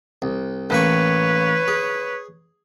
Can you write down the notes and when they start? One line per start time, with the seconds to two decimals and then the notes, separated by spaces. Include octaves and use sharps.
0.22 C2
0.70 A1 A#3 B4 C#5 C#6
1.68 G#4